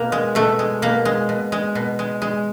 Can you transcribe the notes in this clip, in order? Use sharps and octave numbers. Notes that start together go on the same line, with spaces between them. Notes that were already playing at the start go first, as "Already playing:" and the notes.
Already playing: B2 A#3
G#3
B2 A3
G#3
B2 A#3
G#3
B2
G#3
B2
G#3
G#3